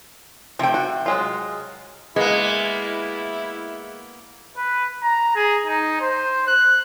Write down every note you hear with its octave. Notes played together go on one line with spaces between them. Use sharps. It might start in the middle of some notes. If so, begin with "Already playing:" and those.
C3 F3 A3 G5
F#4
F#3 G#3 F4
G#3 A#3 B3 E4
B4
A#5
G#4
D#4
C5
F#6